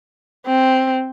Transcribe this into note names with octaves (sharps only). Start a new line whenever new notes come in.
C4